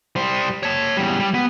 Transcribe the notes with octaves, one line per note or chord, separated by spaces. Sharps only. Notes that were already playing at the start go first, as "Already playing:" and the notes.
G3 C5
C#5 A5
E2 G3
G3
B3